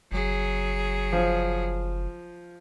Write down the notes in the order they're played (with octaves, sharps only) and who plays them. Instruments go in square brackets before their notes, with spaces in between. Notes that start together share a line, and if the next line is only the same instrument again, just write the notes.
[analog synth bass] F#1 [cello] F#3 G#4
[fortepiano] F3